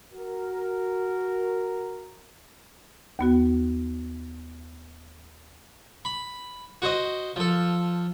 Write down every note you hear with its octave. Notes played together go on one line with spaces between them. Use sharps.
F#4 A#4
D#2 B3 F#4
B5
F#4 C5 D#5
F3 A4